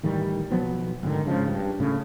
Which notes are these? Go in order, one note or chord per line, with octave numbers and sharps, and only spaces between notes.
A2 D#3 E3 G3
B1 F3 F#3 B3
F1 G#2 D3 D#3
G#2 C#3 F3
G2
A2 C#3